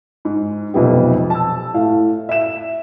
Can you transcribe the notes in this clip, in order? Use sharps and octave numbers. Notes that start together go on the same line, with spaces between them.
G#2
B1 F2 C3 B3 G4
A5 E6
A2 F5
E5 E7